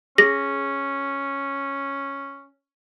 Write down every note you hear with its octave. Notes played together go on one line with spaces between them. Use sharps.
C#4 G#4 A#6